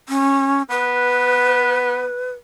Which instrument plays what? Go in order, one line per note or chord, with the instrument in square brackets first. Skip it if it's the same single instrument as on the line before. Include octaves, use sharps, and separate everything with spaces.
[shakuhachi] C#4
[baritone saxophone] B3 [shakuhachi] B4